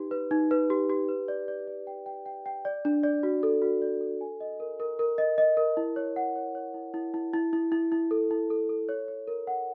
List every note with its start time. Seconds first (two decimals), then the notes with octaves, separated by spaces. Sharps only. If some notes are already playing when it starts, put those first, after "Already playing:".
Already playing: D#4 G4 B4
0.11 B4
0.31 D#4
0.51 B4
0.70 G4
0.90 G4
1.09 B4
1.28 D5
1.48 D5
1.67 D5
1.87 G5
2.06 G5
2.26 G5
2.46 G5
2.65 D5
2.85 D4
3.03 D5
3.23 F#4
3.43 A4
3.62 F#4
3.82 D5
4.01 A4
4.21 G#5
4.40 D#5
4.60 A#4
4.80 A#4
4.99 A#4
5.18 D#5
5.38 D#5
5.57 A#4
5.77 E4
5.96 C#5
6.16 F#5
6.36 C#5
6.55 C#5
6.74 E4
6.94 E4
7.14 E4
7.33 E4
7.53 E4
7.72 E4
7.92 E4
8.11 A4
8.31 E4
8.50 A4
8.69 A4
8.89 C#5
9.08 C#5
9.27 A#4
9.47 F#5